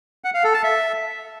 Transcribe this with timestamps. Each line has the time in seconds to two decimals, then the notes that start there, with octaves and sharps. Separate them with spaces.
0.24 F#5
0.34 F5
0.44 A4
0.54 A5
0.63 E5